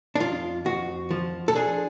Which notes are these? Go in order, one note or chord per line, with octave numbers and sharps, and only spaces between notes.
D4
F2 F4
F2 F#4
F3
A4
D4 G#4